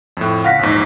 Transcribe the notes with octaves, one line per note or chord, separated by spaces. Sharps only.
F2 A2
C#2 F5 F#5 A#6 B6
A#1 E2 G#2